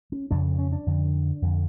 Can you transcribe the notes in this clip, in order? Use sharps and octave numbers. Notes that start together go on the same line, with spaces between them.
C#4
F2 C#3 D4
C#4
D4
F2 D3
F2 D3